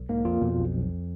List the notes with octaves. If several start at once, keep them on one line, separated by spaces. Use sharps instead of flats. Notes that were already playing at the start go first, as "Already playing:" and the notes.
Already playing: B1
G#2 A#3
F2 F4
F2 B2
B1
B1